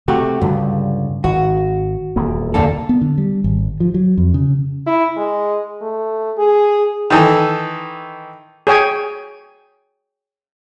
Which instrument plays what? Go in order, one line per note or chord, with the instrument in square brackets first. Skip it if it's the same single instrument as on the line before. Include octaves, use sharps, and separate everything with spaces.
[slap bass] C3 [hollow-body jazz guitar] A3 F#4 G4
[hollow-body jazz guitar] C#2 [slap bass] G2 D3 G3
[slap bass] G#1 [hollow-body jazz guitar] F#4
[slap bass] D#1 E2 A#3
[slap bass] D2 C#3 E3 [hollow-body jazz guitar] A#3 D4 A4
[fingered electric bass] B3
D3
G3
G#1
F3
F#3
F2
C#3
[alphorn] E4
G#3
A3
G#4
[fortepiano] D#3 E3 A4
[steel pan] G#4 C#5 G5 G#5